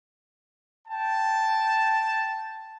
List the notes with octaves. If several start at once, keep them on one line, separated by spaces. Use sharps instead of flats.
G5 A5